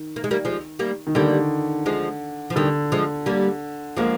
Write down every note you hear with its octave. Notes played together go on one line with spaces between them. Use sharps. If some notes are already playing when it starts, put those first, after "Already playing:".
Already playing: D#3
A#3
G#3
G3 A#3
F3 G#3
G3 A#3
D#3
D3 G3 A#3
F3 G#3
F3
D3 D#3 G3
F3 G#3
G3 A#3
F3 G#3 A#3